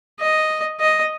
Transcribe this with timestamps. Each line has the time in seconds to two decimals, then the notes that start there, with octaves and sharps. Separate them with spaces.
0.20 D#5
0.80 D#5